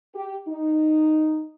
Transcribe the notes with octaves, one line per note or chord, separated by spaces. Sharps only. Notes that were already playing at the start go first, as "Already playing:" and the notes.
G4
D#4